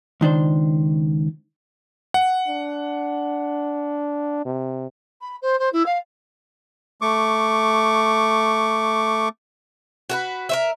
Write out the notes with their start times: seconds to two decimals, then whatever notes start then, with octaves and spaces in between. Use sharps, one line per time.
0.21 C#2 D#3 D4 C5
2.14 F#5
2.48 D4
4.45 C3
5.21 B5
5.42 C5
5.59 C5
5.73 E4
5.86 F5
7.01 A3 C#6 D6
10.09 F#4 A#4 B4
10.49 A#4 C5 E5